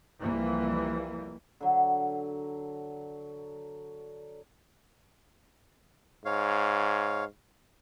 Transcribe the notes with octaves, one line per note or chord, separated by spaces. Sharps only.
C2 F2 E3 G3 A#3
D3 F#3
G#2 C#5 F5